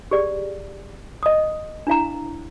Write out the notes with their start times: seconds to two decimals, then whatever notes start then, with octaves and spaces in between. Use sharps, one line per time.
0.11 G4 G#4 D5
1.23 D#5 D#6
1.87 D4 E4 F5 A#5